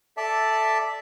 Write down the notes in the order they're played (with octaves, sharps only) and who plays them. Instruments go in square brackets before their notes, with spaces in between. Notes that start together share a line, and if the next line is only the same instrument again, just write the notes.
[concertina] A4 D5 E5 A5